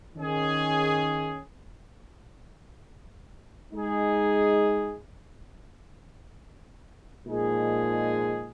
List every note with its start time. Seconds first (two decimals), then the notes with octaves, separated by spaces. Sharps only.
0.16 D#3 C#4 G#4
3.72 G#3 D#4 G#4
7.27 A#2 F3 G#3 D#4 G#4